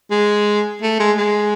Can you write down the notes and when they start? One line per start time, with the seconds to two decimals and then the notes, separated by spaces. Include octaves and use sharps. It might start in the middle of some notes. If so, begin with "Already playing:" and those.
0.11 G#3
0.82 A3
1.00 G#3
1.18 G#3